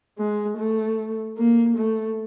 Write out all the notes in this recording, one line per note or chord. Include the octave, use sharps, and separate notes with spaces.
G#3
A3
A#3
A3